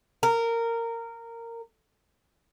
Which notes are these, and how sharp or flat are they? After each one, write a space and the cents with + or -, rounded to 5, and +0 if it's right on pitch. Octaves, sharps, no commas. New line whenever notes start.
A#4 -15